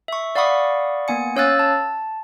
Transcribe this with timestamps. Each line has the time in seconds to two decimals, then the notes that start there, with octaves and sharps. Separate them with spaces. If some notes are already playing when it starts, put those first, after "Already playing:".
0.08 E5 C#6
0.35 D5 F5 F#5 B5 C#6 D#6
1.08 A#3 B3 G#5 C#7
1.36 C#4 C#5 F5 E6 F#6 A6
1.59 A5